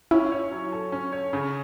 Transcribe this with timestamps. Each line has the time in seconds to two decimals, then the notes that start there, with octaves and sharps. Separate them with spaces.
0.11 C#4 E4
0.32 C#5
0.51 F#3
0.72 A4
0.92 C#4
1.12 C#5
1.33 C#3